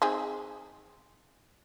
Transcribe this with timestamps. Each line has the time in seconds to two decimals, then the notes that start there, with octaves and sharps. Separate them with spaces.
0.02 C4 D#4 G#4